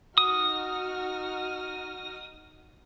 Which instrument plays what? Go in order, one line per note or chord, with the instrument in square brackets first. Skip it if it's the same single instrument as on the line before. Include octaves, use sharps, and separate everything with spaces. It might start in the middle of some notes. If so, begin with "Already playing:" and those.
[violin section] D#4 F#4 F6 [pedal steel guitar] D#6